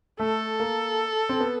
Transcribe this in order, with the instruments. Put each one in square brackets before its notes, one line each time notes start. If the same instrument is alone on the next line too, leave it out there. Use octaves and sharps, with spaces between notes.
[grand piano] A3 [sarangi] A4
[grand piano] A#3
C4
B3